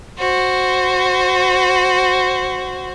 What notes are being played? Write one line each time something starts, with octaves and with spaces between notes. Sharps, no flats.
F#4 C5